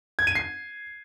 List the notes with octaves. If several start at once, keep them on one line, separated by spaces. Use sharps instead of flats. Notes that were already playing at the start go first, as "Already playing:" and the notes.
G#6
D#7
C7